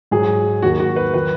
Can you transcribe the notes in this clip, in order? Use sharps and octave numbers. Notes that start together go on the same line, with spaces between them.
G#2 F#3 G#4
D#2 D#3 F#3 F#4
F#4
B4
D#3 F#3 B4